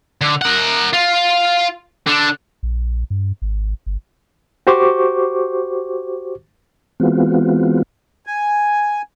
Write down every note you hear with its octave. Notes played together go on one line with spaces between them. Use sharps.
D3
A#4 F#5
F4
D3 D4
A#1
G2
G#1
G1
F#4 G4 C5 C#6 D6
E3 G#3 B3 C4 F4 F#4
G#5